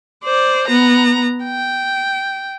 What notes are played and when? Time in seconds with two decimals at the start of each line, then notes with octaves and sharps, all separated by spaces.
0.24 C5 D5
0.68 B3 A#5
1.44 G5